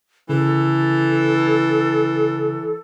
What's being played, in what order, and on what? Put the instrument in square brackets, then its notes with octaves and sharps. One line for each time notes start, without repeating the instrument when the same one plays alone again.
[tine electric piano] C#3 [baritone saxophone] E3 [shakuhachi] A4